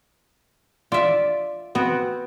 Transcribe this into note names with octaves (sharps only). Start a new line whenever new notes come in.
F4 D5 E5
B3 C4 F#4